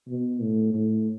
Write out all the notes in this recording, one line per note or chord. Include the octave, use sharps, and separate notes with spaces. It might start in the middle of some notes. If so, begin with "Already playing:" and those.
B2
A2
A2